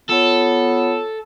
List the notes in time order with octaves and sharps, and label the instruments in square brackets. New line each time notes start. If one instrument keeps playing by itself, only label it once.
[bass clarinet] B3 [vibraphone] F4 C#5 [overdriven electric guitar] A4